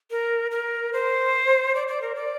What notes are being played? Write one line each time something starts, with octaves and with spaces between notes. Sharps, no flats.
A#4
A#4
C5
D5
D5
A#4
D5